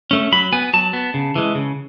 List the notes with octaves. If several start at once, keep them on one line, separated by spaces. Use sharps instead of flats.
A3 C#4
F#3 B5
B3 G#5
F#3 A5
B3
C#3
E3 G#3
C#3